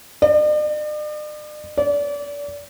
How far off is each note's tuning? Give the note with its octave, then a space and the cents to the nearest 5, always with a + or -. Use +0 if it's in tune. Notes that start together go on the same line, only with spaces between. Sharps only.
D5 +45
D5 -30